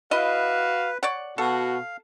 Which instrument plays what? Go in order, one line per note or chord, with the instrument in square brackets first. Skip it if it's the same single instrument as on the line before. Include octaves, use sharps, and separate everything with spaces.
[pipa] E4 D#5 [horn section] F#4 F5 [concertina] B4
[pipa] C#5 D5 F#5
[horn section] B2 F#4 [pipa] A4 [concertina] F5